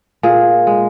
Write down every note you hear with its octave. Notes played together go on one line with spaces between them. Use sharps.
A#2 G#4
G#3